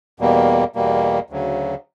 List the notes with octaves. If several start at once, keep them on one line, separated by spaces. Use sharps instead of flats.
E2 B2 G3 A#3
E2 B2 G3 A#3
D2 C#3 F#3